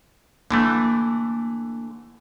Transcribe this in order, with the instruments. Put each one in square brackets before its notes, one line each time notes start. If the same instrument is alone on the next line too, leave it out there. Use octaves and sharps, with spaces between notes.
[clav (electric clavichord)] D3 E3 A3 [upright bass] A#3